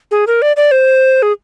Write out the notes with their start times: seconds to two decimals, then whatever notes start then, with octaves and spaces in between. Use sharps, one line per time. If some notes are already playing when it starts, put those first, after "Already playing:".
0.11 G#4
0.27 A#4
0.42 D5
0.57 D5
0.71 C5
1.22 G#4